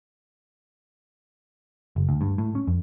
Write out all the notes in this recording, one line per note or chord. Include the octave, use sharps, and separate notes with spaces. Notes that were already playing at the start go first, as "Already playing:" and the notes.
F#1
D2
G2
A2
C#4
F2